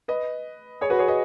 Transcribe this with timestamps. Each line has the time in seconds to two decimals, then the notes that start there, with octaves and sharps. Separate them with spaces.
0.08 B4 D#5
0.81 G#4 C#5
0.90 F#4 B4
0.99 G#4 C#5
1.08 B4 D#5